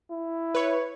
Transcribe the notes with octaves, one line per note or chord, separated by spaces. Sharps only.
E4
B4 C#5